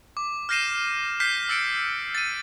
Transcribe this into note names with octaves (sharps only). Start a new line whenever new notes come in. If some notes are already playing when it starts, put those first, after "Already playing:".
D6
F6 G6 A#6 C7 D#7 E7
F6 G6 B6 C7
E6 A6 C#7 D7
A6 D#7